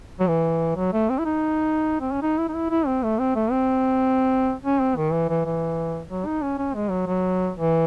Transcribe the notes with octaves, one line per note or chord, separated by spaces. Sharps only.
F#3
E3
F#3
A3
C4
E4
D#4
C4
C#4
D#4
E4
D#4
E4
E4
C4
A3
C4
A3
C4
C#4
C4
D#3
E3
E3
E3
F#3
D#4
C#4
C#4
G#3
F#3
F#3
E3